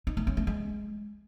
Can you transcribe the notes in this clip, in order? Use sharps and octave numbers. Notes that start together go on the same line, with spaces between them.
D#4
A3
C#4
A3
G#3